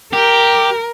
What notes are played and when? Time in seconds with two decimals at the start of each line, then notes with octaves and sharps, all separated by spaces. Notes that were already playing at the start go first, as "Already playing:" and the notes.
0.13 G4 A#4